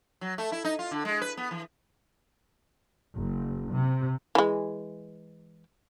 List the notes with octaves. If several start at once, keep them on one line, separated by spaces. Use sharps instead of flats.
F#3
A3
E4
D#4
F4
D3
G#3
B4
B3
E3
F#1
C3
E3 G#3